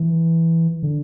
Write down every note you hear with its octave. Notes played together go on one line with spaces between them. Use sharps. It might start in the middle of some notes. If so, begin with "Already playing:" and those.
Already playing: E3
D3